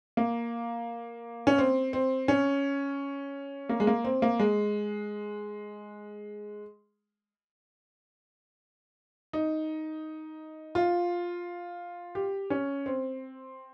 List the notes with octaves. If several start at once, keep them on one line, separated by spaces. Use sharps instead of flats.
A#3
C#4
C4
C4
C#4
A#3
G#3
A#3
C4
A#3
G#3
D#4
F4
G4
C#4
C4